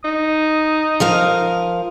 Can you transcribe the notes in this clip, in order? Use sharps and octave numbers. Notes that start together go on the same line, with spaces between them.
D#4 D#6
F3 A#4 F5